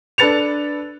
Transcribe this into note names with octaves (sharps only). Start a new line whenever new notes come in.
D4 A4 B4 A6 C#7 F7